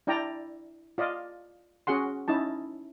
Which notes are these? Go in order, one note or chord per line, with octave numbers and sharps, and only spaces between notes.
D4 E4 D5 G5 A#5
F4 D5 D#5 F5
C#4 F#4 G#4 F#5 C6
C#4 D#4 E4 A5